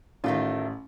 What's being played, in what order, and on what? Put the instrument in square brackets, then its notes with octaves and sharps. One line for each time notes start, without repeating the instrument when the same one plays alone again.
[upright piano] A1 [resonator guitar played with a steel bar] D#3 A3 F4